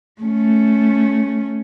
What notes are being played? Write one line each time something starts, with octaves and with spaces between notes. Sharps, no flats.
A3 C#4